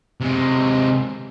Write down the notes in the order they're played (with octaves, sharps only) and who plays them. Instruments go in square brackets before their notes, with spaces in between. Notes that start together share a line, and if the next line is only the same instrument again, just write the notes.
[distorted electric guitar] C3 G#3